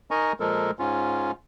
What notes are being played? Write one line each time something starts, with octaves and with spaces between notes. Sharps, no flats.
D#4 A#4 D#5 G#5 A#5 C#6
A#2 F3 G#3 A4 A#4
G#2 C#4 F4